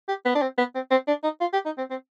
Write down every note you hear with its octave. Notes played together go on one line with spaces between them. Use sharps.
G4
B3
D4
C4
B3
C4
C4
D4
D#4
F4
G4
D#4
C4
C4